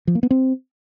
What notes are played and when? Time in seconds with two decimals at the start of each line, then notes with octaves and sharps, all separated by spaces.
0.07 F3
0.15 A#3
0.23 B3
0.31 C4